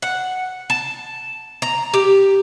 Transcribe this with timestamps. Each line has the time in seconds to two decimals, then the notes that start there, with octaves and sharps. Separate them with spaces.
0.02 F#5
0.70 A5
1.62 A#5
1.94 G4